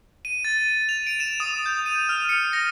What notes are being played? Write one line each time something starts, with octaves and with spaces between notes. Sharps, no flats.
D#7
A6
F7
D7
E7
D#6
G6
D#7
F6
C#7
A#6